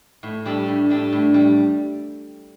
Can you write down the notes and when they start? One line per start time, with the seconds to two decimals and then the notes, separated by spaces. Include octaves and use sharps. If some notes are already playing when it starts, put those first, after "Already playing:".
0.23 A2
0.46 G3 D4 A4
0.68 A2
0.90 G3 D4 A4
1.12 A2
1.34 G3